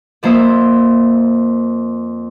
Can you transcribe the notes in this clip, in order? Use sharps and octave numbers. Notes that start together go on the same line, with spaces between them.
F2 F3 A#3 C5 E5 D#6